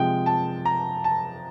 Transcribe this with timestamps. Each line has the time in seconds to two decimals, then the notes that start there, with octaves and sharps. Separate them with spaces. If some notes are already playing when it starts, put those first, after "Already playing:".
Already playing: C3 F3 G#3 G5
0.26 A5
0.65 A#5
1.04 A5